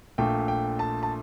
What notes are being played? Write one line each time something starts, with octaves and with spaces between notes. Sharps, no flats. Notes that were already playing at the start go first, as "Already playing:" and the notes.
A#1 A#2 A3 G5
G5
A5
A5